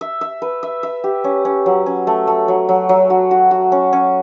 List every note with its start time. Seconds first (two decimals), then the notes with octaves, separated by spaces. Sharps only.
0.01 E5
0.21 E5
0.42 B4
0.63 E5
0.83 E5
1.04 G4
1.24 C#4
1.45 C#4
1.66 F#3
1.86 C#4
2.07 A3
2.27 A3
2.48 F#3
2.69 F#3
2.89 F#3
3.10 F#4
3.31 F#4
3.51 F#4
3.72 C#4
3.93 C#4